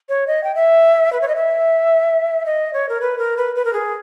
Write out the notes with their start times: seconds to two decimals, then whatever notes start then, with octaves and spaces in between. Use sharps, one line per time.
0.09 C#5
0.27 D#5
0.44 G5
0.55 E5
1.13 B4
1.21 C#5
1.28 D#5
1.36 E5
2.46 D#5
2.73 C#5
2.89 A#4
3.01 B4
3.18 A#4
3.37 B4
3.55 B4
3.65 A#4
3.73 G#4